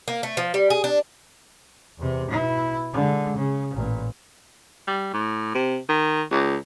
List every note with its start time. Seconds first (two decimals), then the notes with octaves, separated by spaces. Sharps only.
0.08 A#3
0.23 A3
0.37 F3
0.54 G3
0.70 G#4
0.84 D4
1.98 E2 C3
2.30 B2 E4
2.93 D3 G#3
3.37 C#3
3.75 A1 A#2
4.88 G3
5.13 A2
5.54 C3
5.89 D#3
6.31 C#2